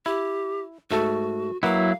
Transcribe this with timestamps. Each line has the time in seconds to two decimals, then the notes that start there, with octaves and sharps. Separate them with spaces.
0.06 E4 G4
0.91 G#2 A3 F#4 A4
1.63 F#3 A#3 E4 B4 F5 F#5